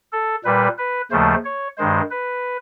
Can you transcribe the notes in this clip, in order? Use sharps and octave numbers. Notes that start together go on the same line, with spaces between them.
A4
A#2 G3 B4
B4
D#2 C#3 F3 A3 C5
C#5
G2 D#3 G#3 C5
B4